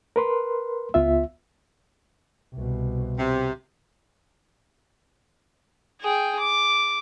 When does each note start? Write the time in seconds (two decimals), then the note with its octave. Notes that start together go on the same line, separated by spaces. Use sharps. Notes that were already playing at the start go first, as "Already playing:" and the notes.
0.16 A#4 B4 C6
0.94 C#2 B3 F4 E5
2.54 C2 B2
3.17 C3
6.01 G#4 G5
6.40 D6